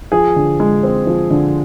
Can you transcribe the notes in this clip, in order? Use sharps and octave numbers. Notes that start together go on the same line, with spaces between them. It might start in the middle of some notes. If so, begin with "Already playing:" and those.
F3 G#4
D3
G#3
C4
F3
D3